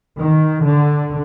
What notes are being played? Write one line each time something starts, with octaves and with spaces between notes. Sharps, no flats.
D#3
D3